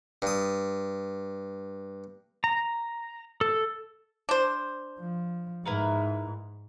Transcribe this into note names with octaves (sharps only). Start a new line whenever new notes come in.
G2 D#6
A#5
A4
D4 C5
F3
G#2 E4 A#4 B4